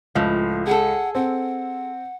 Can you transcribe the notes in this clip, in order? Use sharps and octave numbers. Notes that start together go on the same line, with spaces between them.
C#2 A2 F3
G#4 A4 F#5
C4 F#5